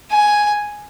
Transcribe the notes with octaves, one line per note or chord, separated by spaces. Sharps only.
G#5